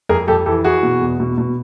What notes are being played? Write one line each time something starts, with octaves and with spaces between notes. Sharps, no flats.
F2 G#4 A#4
F2 G4 A4
E3 G4 A4
E3 F#4 G#4
B2
E2
B2
B2